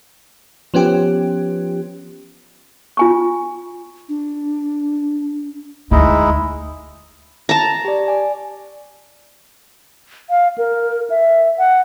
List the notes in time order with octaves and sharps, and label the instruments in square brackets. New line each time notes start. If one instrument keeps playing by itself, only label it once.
[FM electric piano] F3 B3 C#4 G4
[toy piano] F4 G#5 C#6
[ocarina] D4
[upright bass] D2 [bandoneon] G#3 D#4 E4
[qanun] A5 A#5
[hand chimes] G4 D5
D5 G#5
[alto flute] F5
A#4
E5
F#5